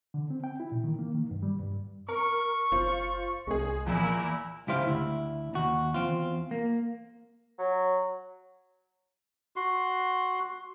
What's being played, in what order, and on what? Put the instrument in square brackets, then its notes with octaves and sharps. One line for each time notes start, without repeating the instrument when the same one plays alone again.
[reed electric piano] D3
C4
G5
E4
A#2
D#3
A#3
D#3
G2
G3
G2
[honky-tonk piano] A#4 [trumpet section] C#6
[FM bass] F#1 [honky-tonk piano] F4 C5
[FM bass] C2 [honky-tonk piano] G#3 G#4
[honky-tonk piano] E2 A#2 [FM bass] F3 [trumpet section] A#3 E4
[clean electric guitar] C#2 G#2 E4 G4 C5 F5
D2 E4
D#2 F#4
E2 C4 F4
A#3
[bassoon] F#3
[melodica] F#4 C6